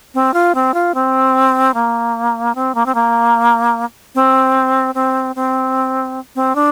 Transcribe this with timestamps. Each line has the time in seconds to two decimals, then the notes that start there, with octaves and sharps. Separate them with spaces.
0.14 C4
0.34 F4
0.55 C4
0.74 F4
0.95 C4
1.74 A#3
2.55 C4
2.75 A#3
2.86 C4
2.95 A#3
4.15 C4
4.95 C4
5.36 C4
6.36 C4
6.55 D4